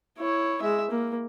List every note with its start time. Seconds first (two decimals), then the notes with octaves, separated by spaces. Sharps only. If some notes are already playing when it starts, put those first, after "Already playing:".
0.18 E4 C#5
0.62 G#3 E5
0.90 A#3